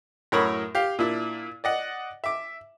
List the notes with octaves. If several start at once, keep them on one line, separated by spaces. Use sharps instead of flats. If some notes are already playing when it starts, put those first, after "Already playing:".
F#2 A2 A#4 C#5 B5 D#6
G4 F5
A#2 D4 E4
D5 D#5 F#5
E5 D6